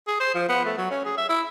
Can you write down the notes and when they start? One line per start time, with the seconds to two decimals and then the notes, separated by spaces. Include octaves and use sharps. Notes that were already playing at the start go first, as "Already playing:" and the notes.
0.07 G#4
0.20 C5
0.35 F3
0.49 B3
0.65 A3
0.77 F#3
0.91 C#4
1.05 G#4
1.17 E5
1.29 E4